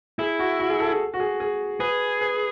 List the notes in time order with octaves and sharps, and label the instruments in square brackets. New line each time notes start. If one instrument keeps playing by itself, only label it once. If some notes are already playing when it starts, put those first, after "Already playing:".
[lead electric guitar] E4 [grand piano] G#4
[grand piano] F#4
F#4
G#4
A4
G#4
F#4
G#4
G#4
[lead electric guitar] G#4 [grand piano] B4
[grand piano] B4